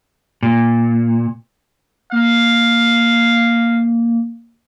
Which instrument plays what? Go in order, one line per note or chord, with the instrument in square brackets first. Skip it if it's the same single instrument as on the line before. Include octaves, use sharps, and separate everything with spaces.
[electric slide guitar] A#2
[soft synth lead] A#3 [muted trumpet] F5